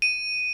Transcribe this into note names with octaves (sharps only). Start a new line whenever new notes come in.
D#7